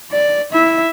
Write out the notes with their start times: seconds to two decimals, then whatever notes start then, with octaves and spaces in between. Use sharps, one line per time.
0.12 D5
0.51 E4 E5